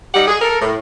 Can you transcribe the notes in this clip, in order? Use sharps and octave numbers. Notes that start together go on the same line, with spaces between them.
G3 D#4 G4 F#5
G#4
A4 A#4
A2